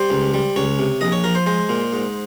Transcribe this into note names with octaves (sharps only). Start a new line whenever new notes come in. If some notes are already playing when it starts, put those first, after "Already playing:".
Already playing: G3 C5
C#2
G3
C#2 C#5
C3
A#1 D#5
C#5
F3 A#4
C5
G#3 C5
A#2
G#2